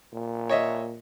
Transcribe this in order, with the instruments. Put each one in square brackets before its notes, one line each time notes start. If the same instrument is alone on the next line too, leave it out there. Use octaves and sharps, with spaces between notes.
[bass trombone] A#2
[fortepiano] C#5 D#5 E5